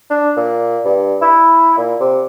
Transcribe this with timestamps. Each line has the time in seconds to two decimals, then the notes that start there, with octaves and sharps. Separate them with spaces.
0.10 D4
0.36 A#2
0.85 G2
1.21 E4
1.77 A#2
2.00 C3